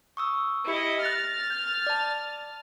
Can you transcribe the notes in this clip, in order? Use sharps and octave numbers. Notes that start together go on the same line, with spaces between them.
C#6 D#6 E6
E4 G4 D#5 C#7
F6 F#6 A6 A#6
G6
D5 A5